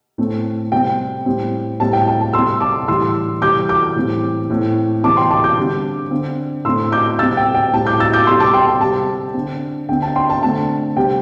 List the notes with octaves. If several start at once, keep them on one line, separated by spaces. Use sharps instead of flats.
A2 A3 C4
C3 G3 C4 G5
A2 G3 C4
A2 G3 C4 A5
G5
A5
A5
C3 G3 C4 C6 E6
A5 D6
A2 E3 G3 C6 E6
C3 E3 G3 D6 G6
D6 G6
A2 E3 G3 C4
A2 A3 C4
C3 E3 C4 A5 D6
G5 C6
A5 D6
D6 G6
D3 G3 C4
D3 C4
A2 A3 C4 C6 E6
D6 G6
C3 G3 C4 E6 A6
G5
G5
A2 G3 C4 A5
D6 G6
E6 A6
D6 G6
C3 G3 C4 C6 E6
A5 D6
G5 C6
A5
C3 G3 C4 A5
D3 C4
D3 C4 G5
A5
G5 C6
A5
D3 A3 C4 A5
C3 G3 C4 G5